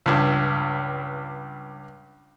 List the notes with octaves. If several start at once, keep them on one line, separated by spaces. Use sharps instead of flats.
C#2 G2